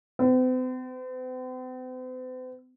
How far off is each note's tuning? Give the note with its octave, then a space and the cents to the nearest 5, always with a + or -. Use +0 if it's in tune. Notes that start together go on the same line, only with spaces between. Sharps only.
C4 -45